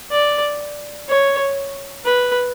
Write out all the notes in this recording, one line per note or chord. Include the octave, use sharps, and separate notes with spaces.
D5
C#5
B4